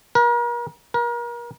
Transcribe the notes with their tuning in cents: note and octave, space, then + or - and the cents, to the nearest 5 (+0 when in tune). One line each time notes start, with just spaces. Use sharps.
A#4 +40
A#4 +35